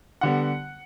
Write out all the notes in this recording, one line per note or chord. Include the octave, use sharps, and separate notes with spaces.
D3 G3 B3 F#5